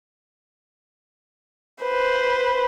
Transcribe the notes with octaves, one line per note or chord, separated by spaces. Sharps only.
B4 C5